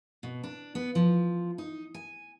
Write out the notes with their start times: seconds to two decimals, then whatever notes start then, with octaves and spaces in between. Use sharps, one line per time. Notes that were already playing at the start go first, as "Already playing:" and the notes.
0.23 B2
0.44 D4
0.75 B3
0.95 F3
1.58 D#4
1.94 G#5